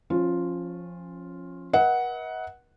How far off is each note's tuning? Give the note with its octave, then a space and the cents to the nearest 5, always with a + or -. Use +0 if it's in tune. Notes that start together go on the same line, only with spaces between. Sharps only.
F3 +0 C#4 -25 F4 +0
B4 -45 D#5 +45 F#5 +0